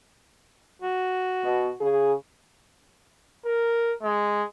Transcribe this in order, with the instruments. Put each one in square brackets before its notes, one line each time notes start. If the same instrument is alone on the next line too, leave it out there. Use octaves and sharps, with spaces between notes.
[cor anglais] F#4
[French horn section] B2
C#3 G#4
[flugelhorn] A#4
G#3